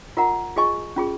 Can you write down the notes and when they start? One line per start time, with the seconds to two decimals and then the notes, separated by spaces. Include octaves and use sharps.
0.17 F4 A#4 D#5 F#5 A#5
0.56 F4 G#4 D#5 G#5 C#6
0.96 C#4 F4 G#4